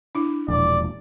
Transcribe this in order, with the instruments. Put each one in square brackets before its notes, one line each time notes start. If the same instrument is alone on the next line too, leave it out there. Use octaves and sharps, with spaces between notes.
[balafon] D4 E4
[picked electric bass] E1 A#1 [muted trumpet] D5